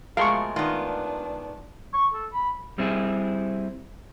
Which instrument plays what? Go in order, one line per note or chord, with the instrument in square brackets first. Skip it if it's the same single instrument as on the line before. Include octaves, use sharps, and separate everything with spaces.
[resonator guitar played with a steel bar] B2 [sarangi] F3 [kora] G#3 A3 A#4 [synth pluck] F5 C6 C#6
[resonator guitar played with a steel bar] D#3 B3 [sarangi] D4 [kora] F4
[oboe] C#6
A4
B5
[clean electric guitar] G3 C4 E4 G#4